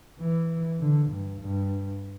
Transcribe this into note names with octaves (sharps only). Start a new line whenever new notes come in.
E3
D3
G2
G2